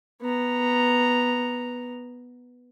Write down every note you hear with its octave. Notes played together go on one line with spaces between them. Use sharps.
B3 A#5